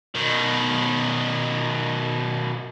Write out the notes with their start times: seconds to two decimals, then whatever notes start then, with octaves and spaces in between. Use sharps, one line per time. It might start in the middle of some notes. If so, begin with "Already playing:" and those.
0.15 B2 D#3